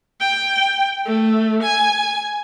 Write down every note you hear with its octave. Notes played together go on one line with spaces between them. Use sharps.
G5
A3
G#5